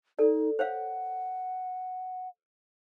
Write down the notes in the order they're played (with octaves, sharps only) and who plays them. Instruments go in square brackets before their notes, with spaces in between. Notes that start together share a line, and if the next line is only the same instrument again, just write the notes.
[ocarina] D#4 [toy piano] A4 D5
[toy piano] C5 C#5 F5 [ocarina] F#5